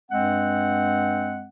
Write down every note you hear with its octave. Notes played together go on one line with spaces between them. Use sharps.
G2 G#3 C4 F#5